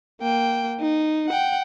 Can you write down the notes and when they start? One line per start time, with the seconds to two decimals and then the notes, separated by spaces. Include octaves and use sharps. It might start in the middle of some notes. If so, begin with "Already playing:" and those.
0.21 A#3 G5
0.80 D#4
1.28 F#5 G5